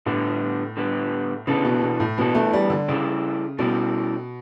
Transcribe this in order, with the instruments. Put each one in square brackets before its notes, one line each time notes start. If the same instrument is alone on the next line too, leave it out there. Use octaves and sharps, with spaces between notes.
[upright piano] A2 [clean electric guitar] D3 G3 B3
[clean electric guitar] D3 G3 B3
[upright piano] C#3 [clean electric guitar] E3 B3 D4 A4
[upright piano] B2
B2
A2
[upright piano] B2 [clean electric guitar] E3 B3 D4 A4
[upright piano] A3
G3
D3
[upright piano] C#3 [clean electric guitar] G3 C#4 E4 A4 D5
[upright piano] B2 [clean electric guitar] G3 C#4 E4 A4 D5